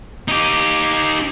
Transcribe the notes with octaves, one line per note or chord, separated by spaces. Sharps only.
D#4 G4